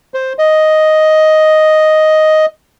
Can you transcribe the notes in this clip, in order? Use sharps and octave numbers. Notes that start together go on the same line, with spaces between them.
C5
D#5